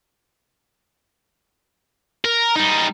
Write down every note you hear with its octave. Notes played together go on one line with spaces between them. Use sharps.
A#4
G3 D#4